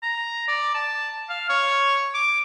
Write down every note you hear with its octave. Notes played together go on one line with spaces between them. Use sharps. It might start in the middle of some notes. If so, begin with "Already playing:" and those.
A#5
D5
A5
F5
C#5
D6